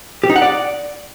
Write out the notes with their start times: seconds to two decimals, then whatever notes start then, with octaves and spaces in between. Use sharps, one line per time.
0.24 G4
0.30 D#4
0.36 F#5
0.42 D5